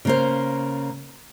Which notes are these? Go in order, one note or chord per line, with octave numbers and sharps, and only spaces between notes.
C#3 A#3 C5